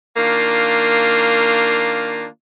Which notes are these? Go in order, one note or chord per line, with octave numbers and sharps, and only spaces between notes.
D#3 A#3 D4 F4